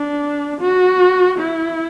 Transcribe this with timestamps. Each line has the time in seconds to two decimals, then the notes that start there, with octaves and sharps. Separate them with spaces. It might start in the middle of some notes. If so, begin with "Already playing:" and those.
Already playing: D4
0.61 F#4
1.39 E4